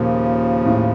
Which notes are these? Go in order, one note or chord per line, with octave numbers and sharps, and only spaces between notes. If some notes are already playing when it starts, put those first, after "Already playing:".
Already playing: D#2 A#2 C#3 F3
A2